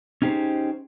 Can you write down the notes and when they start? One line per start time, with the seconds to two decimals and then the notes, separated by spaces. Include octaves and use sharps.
0.22 C#4 D#4 G4 G#4 C5